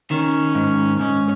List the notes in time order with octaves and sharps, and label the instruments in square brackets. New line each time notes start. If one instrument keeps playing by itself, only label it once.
[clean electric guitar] D#3 [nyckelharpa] C#4
[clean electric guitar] G#2
[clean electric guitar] G#2 [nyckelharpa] C#4